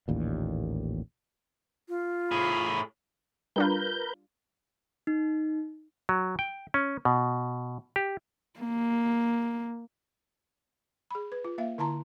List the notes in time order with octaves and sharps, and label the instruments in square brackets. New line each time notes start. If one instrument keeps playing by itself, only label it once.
[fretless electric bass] A1 D#2 A#2
[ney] F4
[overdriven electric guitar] A2 G#4 [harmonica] B5
[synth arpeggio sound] G3 D4 F4 [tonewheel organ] A#4 B4 G6
[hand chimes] D#4
[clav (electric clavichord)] F#3
G5
C#4
B2
G4
[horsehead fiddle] A#3
[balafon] G#4 B5
B4
F4
A#3 E5 F5
D3 E4 A5 A#5 C6